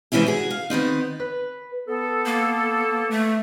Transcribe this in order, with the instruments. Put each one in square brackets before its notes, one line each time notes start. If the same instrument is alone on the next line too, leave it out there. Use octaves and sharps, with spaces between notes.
[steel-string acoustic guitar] G#2 C3 E3 C#4 E4 G#4
F#4 G#4
F5
D#3 B3 C4 D#4
[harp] B4
[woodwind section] B3 A4
[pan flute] A#3
A3